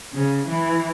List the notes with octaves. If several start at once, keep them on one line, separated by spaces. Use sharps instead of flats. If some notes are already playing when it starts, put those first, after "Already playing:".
C#3
E3